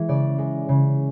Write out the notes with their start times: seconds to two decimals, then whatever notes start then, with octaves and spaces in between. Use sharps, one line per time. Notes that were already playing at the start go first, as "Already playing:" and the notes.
Already playing: E3 G#3
0.08 C#3 D5
0.38 G#3
0.69 C#3